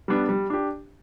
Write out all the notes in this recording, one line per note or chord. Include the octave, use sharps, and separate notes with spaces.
G3 B3 D4
G3
D4 G4